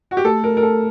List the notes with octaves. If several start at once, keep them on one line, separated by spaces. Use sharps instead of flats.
F#4
G4
A3 A4
A#4
A#4
A4